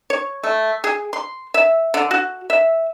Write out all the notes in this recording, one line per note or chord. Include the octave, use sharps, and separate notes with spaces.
C#5
A3
G#4
C6
E5
D3
F#4
E5